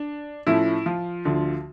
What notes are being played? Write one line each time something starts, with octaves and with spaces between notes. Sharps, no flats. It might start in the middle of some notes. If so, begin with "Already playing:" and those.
Already playing: D4
A2 F3 A3 C#4 E4
F3 F4
D2 D3 F3